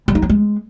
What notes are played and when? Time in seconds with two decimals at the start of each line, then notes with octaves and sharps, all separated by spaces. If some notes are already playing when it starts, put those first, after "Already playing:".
0.08 G3
0.15 D#4
0.22 F#3
0.30 G#3